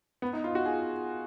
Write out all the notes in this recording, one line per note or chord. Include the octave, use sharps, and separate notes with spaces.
B3
D#4
F4
F#4
G#4